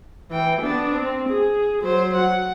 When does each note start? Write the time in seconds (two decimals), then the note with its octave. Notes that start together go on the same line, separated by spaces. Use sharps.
0.31 E3 G5
0.62 B3 D4
0.94 C4
1.29 G#4
1.82 F#3 C5
2.16 F#5